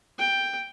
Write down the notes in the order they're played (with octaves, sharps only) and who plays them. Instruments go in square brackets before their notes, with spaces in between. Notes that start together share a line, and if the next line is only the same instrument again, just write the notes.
[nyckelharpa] G5